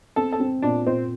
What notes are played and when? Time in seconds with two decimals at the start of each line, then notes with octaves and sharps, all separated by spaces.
0.16 C4 A4
0.32 A4
0.40 C4
0.62 A#2 D4
0.86 A#2 C4